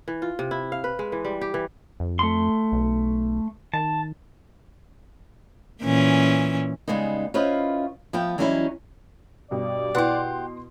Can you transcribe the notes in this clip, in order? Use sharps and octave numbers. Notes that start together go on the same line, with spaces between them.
E3
F4
C3
E4
F5
B4
G#3
E3
G3
G4
E3
F2
A3 C6
B1
D#3 A5
A#2 E3 C#4
C#3 G3 G#3 B3 D#4
C#4 E4 F4 B4 C5 D#5
F3 B3 E5 G5 A5
E3 F#3 G3 C#4 D#4 E4
G2 B2 G4 D5
B2 E4 G4 B4 F#5 C6